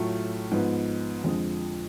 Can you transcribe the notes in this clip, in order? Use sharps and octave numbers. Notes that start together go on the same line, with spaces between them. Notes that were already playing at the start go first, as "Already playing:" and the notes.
Already playing: A2 F#3 A3 F4
G#2 F3 B3
F2 D3 F3 G#3